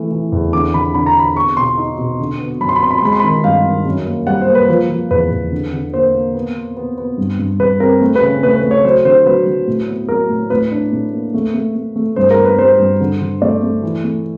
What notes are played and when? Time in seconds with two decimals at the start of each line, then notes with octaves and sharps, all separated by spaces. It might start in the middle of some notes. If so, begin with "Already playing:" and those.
Already playing: E3 A3
0.11 E3
0.32 E2
0.53 D3 D6
0.74 D3 B5
0.94 D3 B5
1.06 A#5
1.15 D3 B5
1.36 B3 C#6
1.57 B2 C6
1.77 D#4
1.98 B2
2.20 D3
2.40 B3
2.61 F#2 B5
2.69 C6
2.76 B5
2.82 B3 C6
2.91 B5
2.98 C6
3.02 G#3 B5
3.13 C6
3.20 D#3 B5
3.44 G2 F5
3.65 D#3
3.86 F#2
4.06 A#3
4.27 G3 F#5
4.41 C5
4.48 A#3
4.55 B4
4.69 F3 B4
4.89 F3
5.11 E2 B4
5.31 E2
5.52 D3
5.73 D3
5.93 A#3 C5
6.14 A#3
6.35 B3
6.56 B3
6.77 B3
6.98 B3
7.18 G2
7.39 G2
7.60 G2 B4
7.80 C4 A#4
8.01 A3
8.15 B4
8.22 C#3
8.43 A3 B4
8.56 B4
8.63 A3
8.71 C#5
8.84 F#3 C5
9.05 D3 C5
9.26 F#3 B4
9.47 F#3
9.67 A2
9.89 B3
10.09 F#3 A#4
10.30 A2
10.50 A2 B4
10.72 D4
10.92 A2
11.13 A#3
11.34 A3
11.54 A3
11.75 A3
11.96 A3
12.16 G2 C5
12.31 A#4
12.37 B3
12.45 B4
12.58 G3 C5
12.79 G2
13.00 D3
13.21 D3
13.42 A3 D5
13.63 A3
13.83 E3
14.04 A3